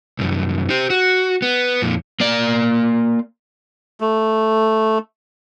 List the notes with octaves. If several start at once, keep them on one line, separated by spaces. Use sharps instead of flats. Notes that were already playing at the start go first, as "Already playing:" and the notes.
C2 F#2
G4 C5
F#4
B3
F2 A#2
A#3 D5
A3